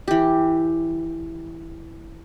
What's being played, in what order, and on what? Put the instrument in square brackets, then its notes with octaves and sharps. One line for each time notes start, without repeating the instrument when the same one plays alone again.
[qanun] E3 G4